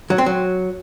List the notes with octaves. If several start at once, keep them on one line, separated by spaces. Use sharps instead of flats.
F#3
C4
F#3